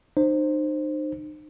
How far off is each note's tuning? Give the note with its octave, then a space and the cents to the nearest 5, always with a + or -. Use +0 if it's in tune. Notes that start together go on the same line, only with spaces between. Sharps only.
D#4 -40 C5 +10